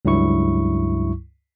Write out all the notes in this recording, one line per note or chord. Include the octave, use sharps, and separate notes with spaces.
C#2 G2 F#3 E4 C#6